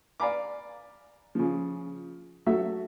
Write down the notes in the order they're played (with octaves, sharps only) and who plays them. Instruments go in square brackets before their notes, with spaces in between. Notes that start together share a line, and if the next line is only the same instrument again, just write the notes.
[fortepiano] D5 F5 G#5 A#5 B5 D6
C#3 F3
F#3 A3 F#4 E5